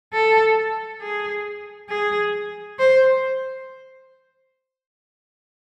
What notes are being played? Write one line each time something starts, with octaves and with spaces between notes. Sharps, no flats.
A4
G#4
G#4
C5